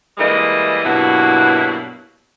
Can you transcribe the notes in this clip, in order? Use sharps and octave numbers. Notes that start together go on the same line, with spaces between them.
E3 G3 G#3 A#3 A4 D#5
G2 B2 F#3 A#3 E4 F#4